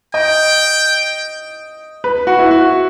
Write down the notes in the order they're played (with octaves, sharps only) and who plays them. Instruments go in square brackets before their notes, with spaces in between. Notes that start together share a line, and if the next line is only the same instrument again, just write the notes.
[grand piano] D#5 [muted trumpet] G5
[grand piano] B4
F#4
E4
F#4